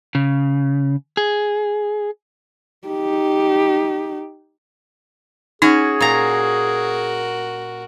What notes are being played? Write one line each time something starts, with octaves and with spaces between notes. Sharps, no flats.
C#3
G#4
D#4 G4
C#4 D#4 F#4 G#4
A#2 F#4 A#4 A#5